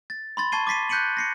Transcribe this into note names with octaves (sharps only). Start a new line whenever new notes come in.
A6
B5 C6 A6
A5 C#6 G#6 C7 D#7 G7
D6 A6 B6 C7 D#7
F#6 G6 B6 C#7 D#7 F#7
A#6 C7 C#7